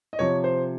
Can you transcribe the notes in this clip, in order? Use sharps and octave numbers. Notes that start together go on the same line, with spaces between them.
D#5
C3 F3 C#5
C5